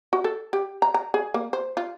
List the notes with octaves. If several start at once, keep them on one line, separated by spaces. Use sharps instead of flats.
F#4
A4
G4
A#5
A#5
G#4
A#3
C5
F4